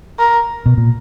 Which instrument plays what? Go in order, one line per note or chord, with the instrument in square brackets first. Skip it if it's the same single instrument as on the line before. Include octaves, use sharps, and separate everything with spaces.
[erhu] A#4
[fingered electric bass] B2
A#2